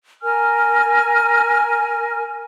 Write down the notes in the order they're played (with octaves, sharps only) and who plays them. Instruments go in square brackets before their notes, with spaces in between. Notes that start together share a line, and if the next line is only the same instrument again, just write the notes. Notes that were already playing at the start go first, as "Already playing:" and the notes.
[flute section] A#4 G#5 F6